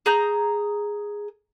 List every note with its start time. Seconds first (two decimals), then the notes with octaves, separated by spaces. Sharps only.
0.06 G#4 A#5 G6